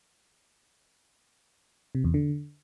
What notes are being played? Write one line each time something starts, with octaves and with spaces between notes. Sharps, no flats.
C3
E2
D3